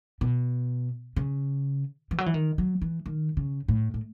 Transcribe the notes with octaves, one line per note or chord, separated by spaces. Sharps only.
B2
C#3
E3
F#3
E3
D#3
F#3
E3
D#3
C#3
A2
A2